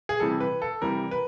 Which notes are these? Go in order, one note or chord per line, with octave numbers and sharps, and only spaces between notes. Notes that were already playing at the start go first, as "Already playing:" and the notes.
G#4
C3 E3 G3 A4
B4
A4
C3 E3 G3 A#4
B4